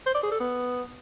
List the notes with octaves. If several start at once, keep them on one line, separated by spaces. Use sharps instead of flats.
C5
D5
G#4
A4
B3